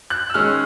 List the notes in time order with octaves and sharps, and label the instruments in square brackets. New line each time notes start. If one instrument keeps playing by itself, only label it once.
[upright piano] F#6
E6
D#3 G#3 C#4 F6